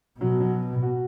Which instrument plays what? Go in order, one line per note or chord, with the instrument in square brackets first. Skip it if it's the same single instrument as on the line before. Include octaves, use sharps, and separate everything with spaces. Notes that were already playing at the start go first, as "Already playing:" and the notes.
[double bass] B2 [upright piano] F#3
[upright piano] F#3
F#4